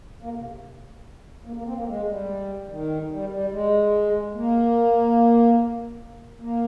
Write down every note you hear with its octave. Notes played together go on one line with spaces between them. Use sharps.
A#3
C3
C3
A#3
A#3
C4
A#3
G#3
G3
D#3
G3
G3
G#3
A#3
A#3